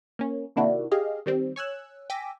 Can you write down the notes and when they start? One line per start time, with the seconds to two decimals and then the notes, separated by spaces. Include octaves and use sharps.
0.19 A#3 C#4
0.56 C3 D#3 A#3 D4 E4 F#4
0.91 G4 G#4 D#5 F5
1.26 D#3 G3 C4
1.56 C#5 G#5 E6 F#6
2.10 G5 G#5 D6 E6 A#6 B6